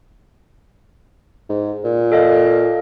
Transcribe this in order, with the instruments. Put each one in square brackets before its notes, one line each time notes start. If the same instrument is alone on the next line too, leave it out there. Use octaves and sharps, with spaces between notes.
[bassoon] G#2
A#2
[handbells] A4 D#5 F5